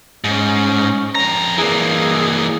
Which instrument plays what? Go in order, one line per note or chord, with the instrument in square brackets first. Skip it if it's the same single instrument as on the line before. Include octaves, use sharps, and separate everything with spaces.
[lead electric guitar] G#2 [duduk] C#4
[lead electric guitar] F2 A#5
[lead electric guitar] E3 A#3 [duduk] G#4